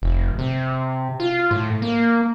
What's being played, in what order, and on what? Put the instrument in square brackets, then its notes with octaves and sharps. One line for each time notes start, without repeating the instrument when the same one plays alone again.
[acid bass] F1
C3
F4
A2
A#3